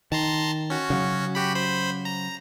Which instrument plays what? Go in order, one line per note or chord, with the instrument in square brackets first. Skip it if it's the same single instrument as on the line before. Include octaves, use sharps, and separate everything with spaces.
[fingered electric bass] D#3 [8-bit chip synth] A5 A#5 C6
[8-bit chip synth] C#4 F#4
[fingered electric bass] C#3 F#3
[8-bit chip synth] F#4 G4 B5
C5 B5
A#5